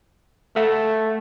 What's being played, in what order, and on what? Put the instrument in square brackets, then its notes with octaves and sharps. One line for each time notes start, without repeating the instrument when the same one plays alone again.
[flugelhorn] A3 [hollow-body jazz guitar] A4 E5 F#5